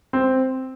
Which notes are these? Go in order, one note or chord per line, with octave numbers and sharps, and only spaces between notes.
C4